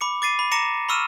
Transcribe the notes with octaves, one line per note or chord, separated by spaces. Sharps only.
B5 D6 C#7
D6 A6 C7 D#7
B5
A#5 D6 A#6 C#7 E7
B5 C#6 E6 F6 D#7 E7